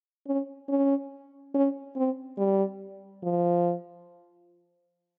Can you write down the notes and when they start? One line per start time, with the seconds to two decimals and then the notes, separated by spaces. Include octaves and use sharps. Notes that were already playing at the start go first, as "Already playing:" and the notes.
0.27 C#4
0.69 C#4
1.54 C#4
1.96 C4
2.38 G3
3.23 F3